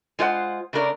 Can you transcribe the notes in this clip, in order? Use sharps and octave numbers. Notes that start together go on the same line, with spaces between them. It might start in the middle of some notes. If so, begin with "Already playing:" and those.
G#3 F4 C5 D5 F#5
C#3 A3 D4 A#4 D5